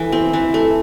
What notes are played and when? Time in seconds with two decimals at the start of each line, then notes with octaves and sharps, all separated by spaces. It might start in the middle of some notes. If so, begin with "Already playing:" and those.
Already playing: E3 A3
0.12 C4
0.33 E3
0.54 A3